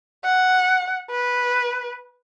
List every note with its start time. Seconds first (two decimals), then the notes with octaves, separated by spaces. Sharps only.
0.24 F#5
1.10 B4